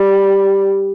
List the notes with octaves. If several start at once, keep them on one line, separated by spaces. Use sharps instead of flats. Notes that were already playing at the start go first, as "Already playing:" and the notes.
Already playing: G3